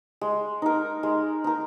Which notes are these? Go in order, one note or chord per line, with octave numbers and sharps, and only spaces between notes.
G#3
D#4 A#4
G#3
D#4 A#4